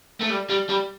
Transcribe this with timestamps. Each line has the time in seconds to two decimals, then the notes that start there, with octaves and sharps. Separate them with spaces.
0.21 A3
0.30 G3
0.50 G3
0.69 G3